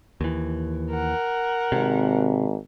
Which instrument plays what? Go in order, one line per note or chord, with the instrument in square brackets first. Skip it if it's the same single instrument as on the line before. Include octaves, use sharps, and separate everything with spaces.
[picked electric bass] D#2 E3
[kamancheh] A#4 F#5
[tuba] G#1 [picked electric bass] C3